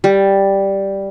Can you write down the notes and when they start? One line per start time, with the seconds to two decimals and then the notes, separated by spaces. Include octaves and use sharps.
0.04 G3